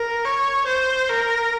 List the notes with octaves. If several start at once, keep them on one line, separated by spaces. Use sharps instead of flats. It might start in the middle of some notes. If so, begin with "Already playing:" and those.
Already playing: A#4
C#5
C5
A#4